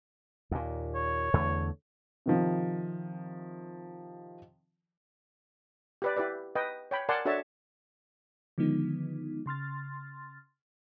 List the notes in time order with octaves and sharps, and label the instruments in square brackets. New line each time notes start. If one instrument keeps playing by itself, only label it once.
[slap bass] D#2 A#2
[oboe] C#5
[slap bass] E2 D3 A3
[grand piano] C3 D#3 F3
[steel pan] G4 B4 D5
E4 G4 B4 D5
B4 D#5 G5
C#5 G5 B5
A#4 D5 F#5 G#5 A5 C6
D4 F#4 A4 C#5 E5 A5
[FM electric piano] D3 D#3 F3 G#3 B3 D#4
C#3 C6 F6 A6